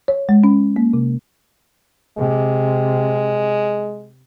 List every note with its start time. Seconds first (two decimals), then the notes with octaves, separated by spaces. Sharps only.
0.08 C#5
0.29 G#3
0.44 C#4
0.76 A#3
0.94 C3
2.18 C3 G#3